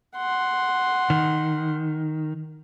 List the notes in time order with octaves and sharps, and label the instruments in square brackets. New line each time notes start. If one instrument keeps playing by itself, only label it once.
[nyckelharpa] F#5 C6
[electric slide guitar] D#3